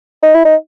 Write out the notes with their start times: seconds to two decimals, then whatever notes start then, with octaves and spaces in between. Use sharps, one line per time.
0.23 D#4
0.35 E4
0.45 D#4